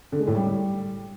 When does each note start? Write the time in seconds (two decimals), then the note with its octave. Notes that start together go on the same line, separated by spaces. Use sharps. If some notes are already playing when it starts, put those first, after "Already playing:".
0.12 D3
0.20 G#3
0.27 A2
0.35 G3